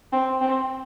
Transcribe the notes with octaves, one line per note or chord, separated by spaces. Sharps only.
C4
C4